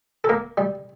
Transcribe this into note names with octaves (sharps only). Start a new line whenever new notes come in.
A4
A#3 A#4
G3